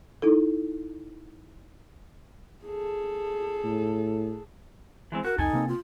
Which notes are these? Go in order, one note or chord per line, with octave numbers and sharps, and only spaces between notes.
D#4 E4 A4
G#4 A4
A2
E3 G#3 C4
F#4 A#4
C2 F2 D#4 A4 G#5
C3 A#3 C4
F4